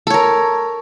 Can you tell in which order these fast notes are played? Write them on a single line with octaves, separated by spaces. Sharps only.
A4 C#5 A#4